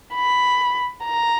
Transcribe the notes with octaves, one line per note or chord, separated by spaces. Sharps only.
B5
A#5